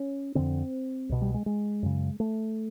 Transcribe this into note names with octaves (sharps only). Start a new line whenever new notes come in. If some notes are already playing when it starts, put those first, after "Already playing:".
Already playing: C#4
F2 D3 C4
C2 B2
G3
G#3
G#3
F#2 C#3
A3